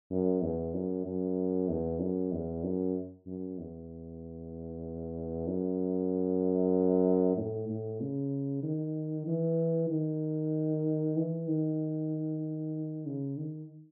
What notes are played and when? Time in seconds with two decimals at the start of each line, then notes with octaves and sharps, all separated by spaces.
0.11 F#2
0.42 E2
0.74 F#2
1.05 F#2
1.69 E2
2.01 F#2
2.32 E2
2.64 F#2
3.26 F#2
3.58 E2
5.47 F#2
7.37 A2
7.69 A2
8.01 C#3
8.63 D#3
9.27 E3
9.90 D#3
11.16 E3
11.48 D#3
13.06 C#3
13.37 D#3